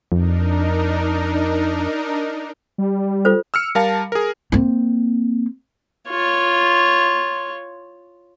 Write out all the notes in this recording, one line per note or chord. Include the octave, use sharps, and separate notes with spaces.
F2 D4 D#4 A#4
G3
F4 A4 C5
E6 F6 C#7
G3 A#4 F5 A5
G#4 A#4
A#3 C4
F4 C#5